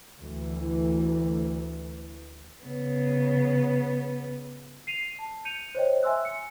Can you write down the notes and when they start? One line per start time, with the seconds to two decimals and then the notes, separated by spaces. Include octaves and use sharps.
0.17 D2 E3
2.64 C#3 B3
4.87 C7 D#7 F7
5.19 A5
5.45 G6 C#7 D#7 F7
5.75 C5 C#5 D#5 G5
6.03 E5 G#5 C6 E6 F#6
6.25 C#7